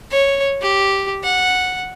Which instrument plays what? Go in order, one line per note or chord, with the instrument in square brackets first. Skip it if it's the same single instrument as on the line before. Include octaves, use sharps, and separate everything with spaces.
[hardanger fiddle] C#5
G4
F#5